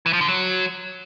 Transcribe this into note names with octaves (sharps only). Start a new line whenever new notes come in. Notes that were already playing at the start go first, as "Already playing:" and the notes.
E3
F3
D3
F#3